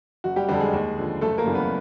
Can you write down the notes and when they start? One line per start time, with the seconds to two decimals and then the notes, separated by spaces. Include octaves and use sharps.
0.24 F#1 F#4
0.36 G3 G4
0.48 F2 D3 G3 G4
0.54 A4
0.60 G#3 G#4
0.73 D#2
0.98 D3 F3
1.21 F#1 A3 A4
1.38 A#3 A#4
1.46 F#2 C#3 E3 G3
1.54 B3 B4